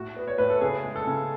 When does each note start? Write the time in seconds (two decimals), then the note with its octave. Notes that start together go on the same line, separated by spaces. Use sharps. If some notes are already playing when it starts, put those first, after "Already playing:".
Already playing: A2 F#4
0.16 B3
0.27 C#5
0.38 A2 B4
0.50 A4
0.61 C#3 G#4
0.84 G#3
0.96 A4
1.07 C#3